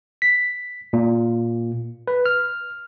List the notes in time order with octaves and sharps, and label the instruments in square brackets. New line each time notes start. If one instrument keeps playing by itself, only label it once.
[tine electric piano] B6
A#2
B4
F6